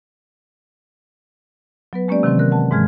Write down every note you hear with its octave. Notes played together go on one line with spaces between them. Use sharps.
F#3 B3 B4
G#3 A#3 C#4 G4 D5
C3 D#3 E3 F#3 C4
A#4 F#6
F#5 A5
G#2 E3 G#3 F6 G#6